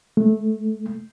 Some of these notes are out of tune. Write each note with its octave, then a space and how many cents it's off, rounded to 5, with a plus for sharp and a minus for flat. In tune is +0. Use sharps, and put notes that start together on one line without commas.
A3 -15